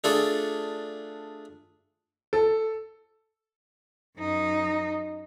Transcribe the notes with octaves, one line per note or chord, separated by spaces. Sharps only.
A3 D4 F4 G#4 A4
A4
F#2 D#4